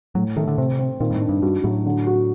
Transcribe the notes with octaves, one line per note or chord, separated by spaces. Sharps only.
A2 F#3
D#3 A3
D3
C3 C4
C4
A#2 D#3
G2
A2
D4
G2
G2 F#4
A2 F#3
D3
F#4